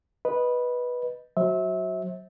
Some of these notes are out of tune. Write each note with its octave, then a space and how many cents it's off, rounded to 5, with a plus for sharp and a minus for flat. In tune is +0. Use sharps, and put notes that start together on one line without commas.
B4 -10 D#5 +0
F#3 +0 C5 +35 E5 -25